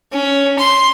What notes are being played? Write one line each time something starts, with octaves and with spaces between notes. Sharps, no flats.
C#4
C6